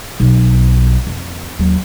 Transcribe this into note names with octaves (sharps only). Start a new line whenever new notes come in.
B1
F2
D#2 F#3